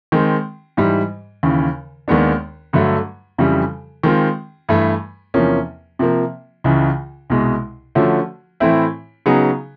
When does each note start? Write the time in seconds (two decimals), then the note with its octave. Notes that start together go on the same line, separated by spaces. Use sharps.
0.12 D#3 G#3 C4
0.77 G#2 E3 G3
1.43 D#2 C#3 E3
2.08 D#2 D#3 G#3 B3 D4
2.73 G2 D3 F#3 A3
3.38 F2 C#3 E3 G3
4.03 D#3 G#3 C4 F4
4.69 G2 E3 A3
5.34 E2 C3 F3 A#3 C#4
5.99 C3 F3 A#3
6.64 C#2 C#3 E3
7.30 C2 B2 G#3
7.95 D3 F3 A3 C#4 F#4
8.60 A2 E3 A3 C4 E4
9.26 C#3 F#3 B3 D#4 G#4